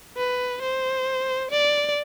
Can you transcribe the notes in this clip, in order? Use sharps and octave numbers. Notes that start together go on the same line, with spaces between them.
B4
C5
D5